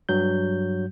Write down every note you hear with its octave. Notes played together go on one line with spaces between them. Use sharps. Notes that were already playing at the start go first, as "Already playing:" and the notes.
G2 F#3 G6